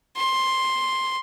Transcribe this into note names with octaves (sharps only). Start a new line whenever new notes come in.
C6